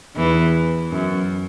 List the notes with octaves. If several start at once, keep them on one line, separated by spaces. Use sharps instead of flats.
E2 E3
F#2